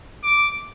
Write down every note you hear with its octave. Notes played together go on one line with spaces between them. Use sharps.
D6